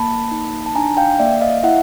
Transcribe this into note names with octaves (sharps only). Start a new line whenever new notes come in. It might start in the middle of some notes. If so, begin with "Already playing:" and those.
Already playing: A#3 A5 B5
D#4
A5
D4 G#5 A#5
F5 G5
A#3 D5 E5
D#5 F5
E4 E5 F#5